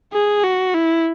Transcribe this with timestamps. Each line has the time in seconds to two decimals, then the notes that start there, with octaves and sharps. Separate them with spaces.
0.13 G#4
0.44 F#4
0.74 E4